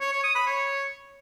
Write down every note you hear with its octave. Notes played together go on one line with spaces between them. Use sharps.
C#5
C#5
D#6
B5
C#5